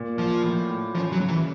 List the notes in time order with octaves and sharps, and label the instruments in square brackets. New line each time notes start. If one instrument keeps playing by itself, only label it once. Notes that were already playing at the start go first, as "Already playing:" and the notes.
Already playing: [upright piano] A#2
[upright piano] A#2 [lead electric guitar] F3
[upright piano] A2
A2
[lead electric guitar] F3 [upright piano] C#4
[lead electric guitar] F#3
[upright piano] C#3
[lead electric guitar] E3